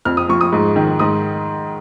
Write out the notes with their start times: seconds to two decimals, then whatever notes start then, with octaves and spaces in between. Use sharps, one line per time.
0.05 F2 F6
0.17 D#6
0.29 F3 C#6
0.41 D#6
0.52 G#2
0.76 D#3
0.99 G#2 D#6